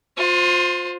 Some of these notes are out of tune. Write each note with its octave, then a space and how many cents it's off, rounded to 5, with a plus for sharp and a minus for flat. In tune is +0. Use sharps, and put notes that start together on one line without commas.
F4 +30 C5 +0